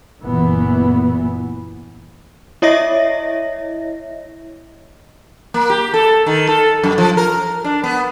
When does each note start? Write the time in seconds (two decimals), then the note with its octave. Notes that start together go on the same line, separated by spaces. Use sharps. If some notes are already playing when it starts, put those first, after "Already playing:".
0.22 F#1 A#2 E3 B3
2.62 E4 C#5 D#5 E5 A#6
5.54 A#3
5.70 G4
5.94 A4
6.26 D#3
6.49 A4
6.84 F#2
6.98 F3
7.17 A#4
7.64 D4
7.84 B3